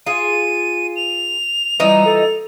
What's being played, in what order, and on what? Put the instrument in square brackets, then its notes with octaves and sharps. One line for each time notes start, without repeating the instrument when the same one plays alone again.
[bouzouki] F4 G#4 [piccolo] D#7
[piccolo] F7
[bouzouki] E3 F3 D#4 [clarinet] G3
[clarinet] A4